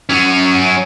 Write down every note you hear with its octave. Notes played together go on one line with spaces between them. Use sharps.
F#3 C#4